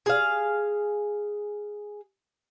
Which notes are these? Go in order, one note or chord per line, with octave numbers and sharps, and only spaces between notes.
G#4 F5